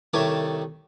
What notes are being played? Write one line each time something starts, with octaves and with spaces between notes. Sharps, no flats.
C2 D#3 A3 C#5 A5 D6